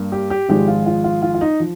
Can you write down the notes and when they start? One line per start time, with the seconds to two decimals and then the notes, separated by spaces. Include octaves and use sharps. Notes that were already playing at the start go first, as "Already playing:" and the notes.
Already playing: G2 G3 A#3
0.12 G4
0.30 G4
0.49 G#1 G#2 F3 G#3 G4
0.68 F4
0.86 F4
1.04 F4
1.22 F4
1.34 F4
1.41 D#4
1.60 F3